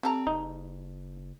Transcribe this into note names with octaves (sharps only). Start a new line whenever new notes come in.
G3 C4 A4 A#5
F#1 D#4